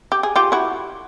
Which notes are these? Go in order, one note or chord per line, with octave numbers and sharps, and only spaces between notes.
G4
G#4
F4 G4
E4 F#4